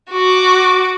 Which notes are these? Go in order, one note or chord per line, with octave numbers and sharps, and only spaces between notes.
F#4 D6